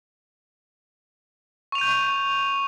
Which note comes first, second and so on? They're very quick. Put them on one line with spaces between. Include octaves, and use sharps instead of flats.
C#6 F7 D#7 G6